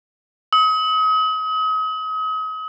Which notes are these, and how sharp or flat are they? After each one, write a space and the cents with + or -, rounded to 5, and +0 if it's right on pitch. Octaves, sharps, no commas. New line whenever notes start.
D#6 +40